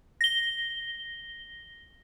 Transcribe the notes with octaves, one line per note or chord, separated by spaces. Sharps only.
A#6 G7